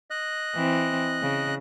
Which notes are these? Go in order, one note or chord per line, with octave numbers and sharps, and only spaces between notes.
D#5 F#6
E3 C4
C#3